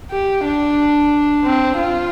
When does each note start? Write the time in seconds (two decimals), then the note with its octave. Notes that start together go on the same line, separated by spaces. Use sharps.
0.11 G4
0.45 D4
1.45 C4
1.78 F4